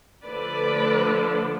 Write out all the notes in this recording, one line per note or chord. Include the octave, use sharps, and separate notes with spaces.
D3 F3 A3 D4 B4 D5